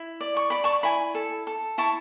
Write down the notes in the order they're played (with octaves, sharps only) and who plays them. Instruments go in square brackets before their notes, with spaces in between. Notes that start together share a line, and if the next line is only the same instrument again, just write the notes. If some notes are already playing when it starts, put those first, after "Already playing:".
Already playing: [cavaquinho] E4
D5
C#6
D5 B5
A5 C#6
E4 G#5 B5
A4
A4
E4 A5 C#6